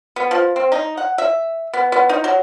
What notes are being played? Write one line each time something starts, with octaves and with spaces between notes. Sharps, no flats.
B3
F3
C4
D#4
F#5
E5
B3
B3
D#4
F#3